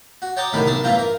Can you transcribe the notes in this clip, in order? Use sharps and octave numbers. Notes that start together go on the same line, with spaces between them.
F#4
C#5 G5 A5 A#5 D6 D#6
C2 A2 D3 D#3 B5
B1 D4 A5 D#6
A1 G2 E3 F4 G5 A#5
A#4